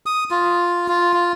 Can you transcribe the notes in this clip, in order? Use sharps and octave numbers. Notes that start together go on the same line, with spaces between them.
D#6
F4
F4
F4